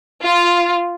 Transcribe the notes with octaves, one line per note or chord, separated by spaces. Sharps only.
F4